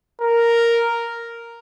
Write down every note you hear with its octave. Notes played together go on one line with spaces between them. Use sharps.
A#4